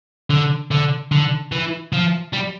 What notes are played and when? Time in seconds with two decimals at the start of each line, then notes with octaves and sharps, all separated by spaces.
0.30 D3
0.71 D3
1.12 D3
1.52 E3
1.93 F3
2.33 G3